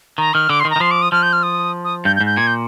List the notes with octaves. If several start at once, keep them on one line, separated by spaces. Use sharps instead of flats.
D#3 A#5
D#3 F6
D3 D6
C6
D#3
A#5
D#3
F3 C6
D6
D#6
F3 F6
G6
F6
D#6
D#6
G2 G6
G6
G#2
G6
A#2 G#6
G6